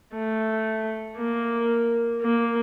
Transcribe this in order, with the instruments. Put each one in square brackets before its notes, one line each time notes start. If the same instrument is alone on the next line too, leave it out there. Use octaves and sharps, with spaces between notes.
[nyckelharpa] A3
A#3
A#3